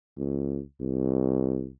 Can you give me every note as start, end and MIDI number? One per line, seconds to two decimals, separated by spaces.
0.18 0.61 37
0.81 1.69 36